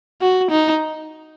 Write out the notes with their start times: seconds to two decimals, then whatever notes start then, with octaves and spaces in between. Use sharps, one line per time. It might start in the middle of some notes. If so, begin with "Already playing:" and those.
0.22 F#4
0.51 D#4